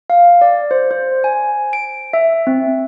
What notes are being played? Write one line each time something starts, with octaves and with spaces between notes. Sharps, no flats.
F5
D5
C5
C5
G#5
D7
E5
C4